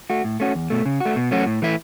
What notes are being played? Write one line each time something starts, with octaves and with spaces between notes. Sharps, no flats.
A3 F#4
A2
A3 C#4 F#4
E2
B2 A3
C#3
A3 F#4
B2
F#3 A3 C#4 F#4
A2
E3 A3 E4